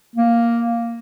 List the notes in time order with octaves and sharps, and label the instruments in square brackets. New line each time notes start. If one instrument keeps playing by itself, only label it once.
[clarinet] A#3